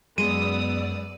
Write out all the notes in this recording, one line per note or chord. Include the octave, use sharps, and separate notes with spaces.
F#2 G#3 B3 D5 D#6 E6 D#7